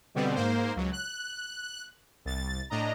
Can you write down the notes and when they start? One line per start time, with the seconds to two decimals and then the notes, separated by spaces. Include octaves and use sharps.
0.15 B2 D3 G3 B3 C4
0.35 G#2 A#3 C5
0.76 C#2 F#3
0.92 F#6
2.25 C2 A6
2.70 A2 D4 D#5 A#5